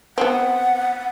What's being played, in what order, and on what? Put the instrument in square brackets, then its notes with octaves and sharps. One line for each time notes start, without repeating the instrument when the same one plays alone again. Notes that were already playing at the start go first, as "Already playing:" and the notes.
[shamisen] B3 C4 [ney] F#5